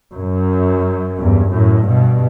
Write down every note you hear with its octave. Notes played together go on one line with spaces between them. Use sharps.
F#2
E2 G2
F#2 A2
G2 B2